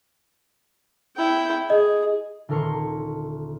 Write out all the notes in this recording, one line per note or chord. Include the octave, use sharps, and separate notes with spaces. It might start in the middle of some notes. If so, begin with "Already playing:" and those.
E4 G5
G#4 D#5
D#1 D3 A#4 C6 C#6